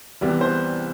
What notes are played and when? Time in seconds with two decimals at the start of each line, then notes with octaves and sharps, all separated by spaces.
0.21 C2 C3 E3 G3 B3
0.41 C5
0.51 B4